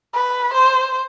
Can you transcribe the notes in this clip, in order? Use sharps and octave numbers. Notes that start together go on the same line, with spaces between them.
B4
C5